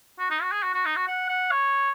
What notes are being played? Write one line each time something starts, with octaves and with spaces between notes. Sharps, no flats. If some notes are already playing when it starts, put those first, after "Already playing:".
F#4
D#4
F#4
G#4
F#4
F#4
D#4
F#4
F#5
F#5
C#5